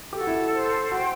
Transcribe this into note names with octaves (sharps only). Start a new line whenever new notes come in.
G4 A4
F#4
E4
F#4
C5
F#4 G5